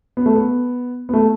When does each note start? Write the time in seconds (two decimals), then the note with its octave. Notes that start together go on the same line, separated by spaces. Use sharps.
0.17 B3
0.26 A3
0.35 B3
1.09 B3
1.13 A3